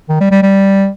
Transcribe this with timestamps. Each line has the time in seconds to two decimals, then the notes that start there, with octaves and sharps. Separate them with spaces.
0.09 D#3
0.21 G3
0.31 G3
0.43 G3